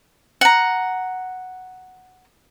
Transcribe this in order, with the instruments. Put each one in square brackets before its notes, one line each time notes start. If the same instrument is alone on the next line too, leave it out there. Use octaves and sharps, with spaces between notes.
[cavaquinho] F#5 A#5